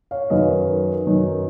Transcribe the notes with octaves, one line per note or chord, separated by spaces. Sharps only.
C#5 F5
F#2 D#3 F#3 B4 D#5
F#2 D#3 F#3